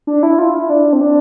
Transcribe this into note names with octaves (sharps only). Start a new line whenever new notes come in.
D4
E4
F4
E4
D4
C4
D4